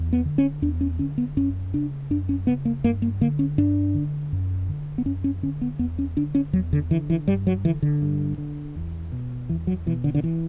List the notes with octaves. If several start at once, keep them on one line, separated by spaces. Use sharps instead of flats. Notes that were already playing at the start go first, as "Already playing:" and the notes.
Already playing: E2
B3
D3
C#4
E2 D4
C#4
D3 C#4
B3
F#2 C#4
C#3 D4
F#2 D4
C#4
C#3 B3
A#3
G2 A#3
A#3
D3 A#3
C#4
G2 D4
D3
F#2
D3
B3
F#2 C#4
C#4
D3 C#4
B3
E2 B3
C#4
D3 D4
C#4
E2 F#3
D3
D3 E3
E3
G2 G3
F#3
D3 E3
D3
G2
D3
E2
B2
E2 E3
F#3
B2 E3
D3
D3
E3